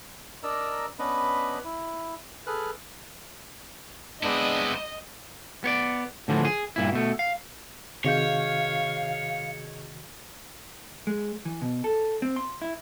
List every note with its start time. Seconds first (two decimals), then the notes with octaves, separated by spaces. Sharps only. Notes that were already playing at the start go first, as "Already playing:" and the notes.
0.43 D4 A#4 D5 D#5 A#5 E6
0.99 B3 C#4 D4 B4 D#5 B5
1.64 E4
2.47 G#4 A4 B4 F6 F#6
4.23 G#3 B3 C4 D4 E4 D#5
5.64 B3 C#5 D5
6.28 A2 D3 E3 F3
6.45 G#4
6.76 G2 A#2 E4
6.92 B2 A3
7.19 F5
8.05 C3 D#3 F#4 G#4 C#5 D#5 F5 G6
11.07 G#3
11.45 E3
11.62 B2
11.84 A4
12.22 C4
12.36 C6
12.62 E4